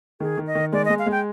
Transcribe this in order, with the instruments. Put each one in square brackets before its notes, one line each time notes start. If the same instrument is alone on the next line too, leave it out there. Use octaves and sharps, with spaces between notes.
[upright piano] D#3 [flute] G#4
[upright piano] D#3
[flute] D#5
[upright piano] D#3
[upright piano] G#3 [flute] D5
[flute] D#5
[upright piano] G#3
[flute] F5
[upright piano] G#3
[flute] G5